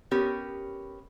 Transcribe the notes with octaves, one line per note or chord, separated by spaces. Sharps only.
B3 C#4 G4 A#4